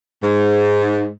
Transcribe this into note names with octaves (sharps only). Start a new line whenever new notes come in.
G#2